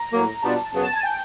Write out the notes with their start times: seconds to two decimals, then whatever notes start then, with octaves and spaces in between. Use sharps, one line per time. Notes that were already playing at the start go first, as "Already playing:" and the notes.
Already playing: A#5
0.12 A2 F#3 A#3
0.42 B2 G3 B3 D4 F4 A5
0.73 F#2 C#3 F#3 B3
0.83 A5
0.93 G#5
1.03 G5